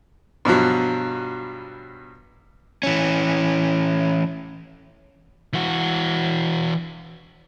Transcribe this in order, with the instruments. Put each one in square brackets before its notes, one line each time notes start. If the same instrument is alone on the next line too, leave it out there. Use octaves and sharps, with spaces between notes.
[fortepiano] G2 B2 F3 F#3
[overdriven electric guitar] E3 C#4
[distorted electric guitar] E3 F#4